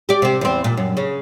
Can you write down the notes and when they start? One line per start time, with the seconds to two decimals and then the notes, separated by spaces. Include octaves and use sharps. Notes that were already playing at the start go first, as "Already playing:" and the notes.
0.09 G4 D5
0.22 C3 C4
0.41 E2 C4
0.64 A#2
0.77 F#2
0.97 C#3